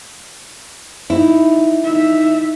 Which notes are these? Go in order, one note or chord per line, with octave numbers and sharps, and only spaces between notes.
D#4 E4
D#4 E5